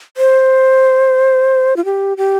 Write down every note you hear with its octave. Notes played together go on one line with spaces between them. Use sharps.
C5
F4
G4
G4